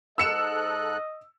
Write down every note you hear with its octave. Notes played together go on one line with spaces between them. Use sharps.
G#2 A4 D#5 E6 F#6 C#7 E7